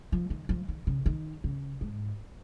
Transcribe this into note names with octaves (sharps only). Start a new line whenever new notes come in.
F3
D#3
F3
D#3
C#3
D#3
C#3
G#2